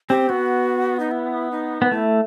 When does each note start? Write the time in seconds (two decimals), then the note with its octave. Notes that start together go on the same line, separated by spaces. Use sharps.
0.09 C4 G4
0.29 B3 F#4
1.00 D#4
1.11 E4
1.51 D#4
1.82 B3
1.91 A3 E4